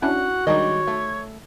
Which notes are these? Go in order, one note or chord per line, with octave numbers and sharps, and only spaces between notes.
C#4 D4 E4 F#4 F#5
D#3 G3 G#3 D4 D#4 C#5 D#5
A3